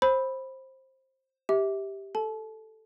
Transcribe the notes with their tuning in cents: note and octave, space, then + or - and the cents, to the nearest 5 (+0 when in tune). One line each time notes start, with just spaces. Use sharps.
C5 +15 B5 +0 E6 -20
G4 +0 E5 -25
A4 +0 A5 -35